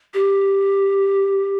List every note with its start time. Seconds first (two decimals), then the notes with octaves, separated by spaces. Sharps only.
0.14 G4